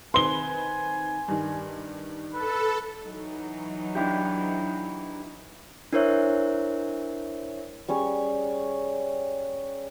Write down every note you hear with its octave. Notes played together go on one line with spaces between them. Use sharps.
D#3 C4 B4 G#5 C6 G7
G2 D#3
A4 B4
E3 F#3 D#4
D4 E4 G4
D4 E4 A#4 C5 C#5 E5
G3 C#4 G#4 C#5